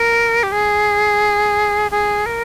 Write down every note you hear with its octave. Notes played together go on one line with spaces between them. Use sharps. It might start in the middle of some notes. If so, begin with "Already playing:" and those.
Already playing: A#4
G4
G#4
G#4
A#4